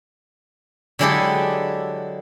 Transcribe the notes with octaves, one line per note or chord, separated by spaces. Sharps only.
D3 F#3 G#3 E4 G4 A4